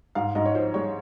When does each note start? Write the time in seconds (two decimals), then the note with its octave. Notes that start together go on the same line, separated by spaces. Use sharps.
0.15 G#2 F5
0.35 G#2 D#5
0.45 C#5
0.55 F3 C5
0.74 G#3 C#5